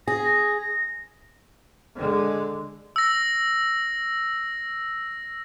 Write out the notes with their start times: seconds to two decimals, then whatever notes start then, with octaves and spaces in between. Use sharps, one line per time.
0.08 G#4 A#6
1.95 D3 G#3
2.96 E6 A#6